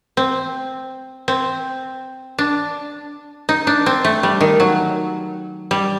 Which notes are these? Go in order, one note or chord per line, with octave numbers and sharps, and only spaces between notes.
C4
C4
D4
D#4
D4
C4
A3
G3
D#3
F#3
G3